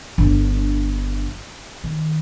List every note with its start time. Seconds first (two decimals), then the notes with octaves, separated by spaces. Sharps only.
0.18 G1 D4
1.84 D#3